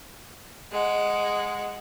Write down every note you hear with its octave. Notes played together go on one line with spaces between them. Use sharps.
G#3 F#5